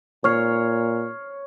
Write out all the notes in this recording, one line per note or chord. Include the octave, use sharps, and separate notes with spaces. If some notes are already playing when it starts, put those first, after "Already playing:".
A#2 C#5 C#6 F6 C7